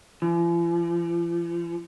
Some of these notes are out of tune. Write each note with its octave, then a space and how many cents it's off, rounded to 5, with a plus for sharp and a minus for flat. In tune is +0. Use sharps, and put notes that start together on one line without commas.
F3 -45